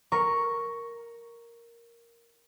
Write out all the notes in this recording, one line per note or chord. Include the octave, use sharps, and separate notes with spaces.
A#4 C#6